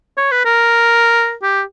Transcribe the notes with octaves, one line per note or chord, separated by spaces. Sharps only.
C#5
B4
A#4
G4